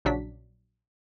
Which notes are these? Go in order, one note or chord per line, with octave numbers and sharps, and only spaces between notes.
A#1 C#3 F#3 D4 B6